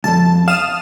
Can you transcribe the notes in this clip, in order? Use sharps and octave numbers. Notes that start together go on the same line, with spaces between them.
C2 F2 A5
F5 D#6 F6 E7